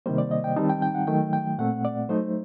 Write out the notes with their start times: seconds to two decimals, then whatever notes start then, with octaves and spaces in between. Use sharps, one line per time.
0.06 C3 D#3 G3 A#3 C5
0.18 D5
0.31 D#5
0.44 G5
0.56 D#3 G3 C4 D#4 A5
0.69 G5
0.82 G5
0.95 F#5
1.07 D#3 F#3 A3 G5
1.33 G5
1.58 A#2 A3 C4 F#5
1.85 D5
2.09 F#3 A3 D#4 C5